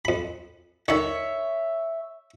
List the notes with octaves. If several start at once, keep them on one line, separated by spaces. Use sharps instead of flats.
F2 B5
D3 D#3 C#5 E5